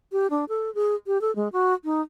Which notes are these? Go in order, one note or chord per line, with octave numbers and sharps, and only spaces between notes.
G4
D4
A4
G#4
G4
A4
G#3
F#4
D#4